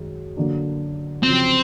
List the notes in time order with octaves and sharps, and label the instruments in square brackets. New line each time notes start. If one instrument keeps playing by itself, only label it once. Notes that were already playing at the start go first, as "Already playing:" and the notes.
Already playing: [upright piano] F#2 D#3 G#3
D3 F#3 A#3 D4
[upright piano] F2 C#3 F#3 [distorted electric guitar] C4